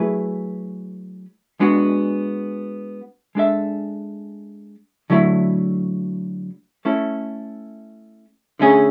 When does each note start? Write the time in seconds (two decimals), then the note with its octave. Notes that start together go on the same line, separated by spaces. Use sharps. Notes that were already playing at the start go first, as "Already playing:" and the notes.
Already playing: F#3 A3 E4 G#4 B4
1.60 G#3 B3 D4 F#4
3.35 G#3 D4 A4 E5
5.10 D3 F#3 A3 E4
6.85 A3 C#4 E4 A4
8.59 D3 A3 C#4 G#4